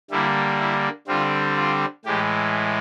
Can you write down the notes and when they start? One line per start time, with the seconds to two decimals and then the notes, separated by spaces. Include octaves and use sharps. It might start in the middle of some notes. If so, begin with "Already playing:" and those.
0.11 D3 G3 A#3 E4
0.60 E4
1.07 D3 G3 C4 F4
1.57 F4
2.05 A2 E3 G#3 G4